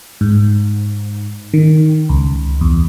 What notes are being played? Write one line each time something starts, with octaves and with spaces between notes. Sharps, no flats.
G#2
D#3
C#2
E2